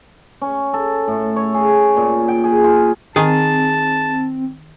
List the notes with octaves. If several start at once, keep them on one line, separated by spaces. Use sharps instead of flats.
C#4
A4
A2
C#5
G#4
A#2
G5
G#4
F4
D#3 C4 G#4 A5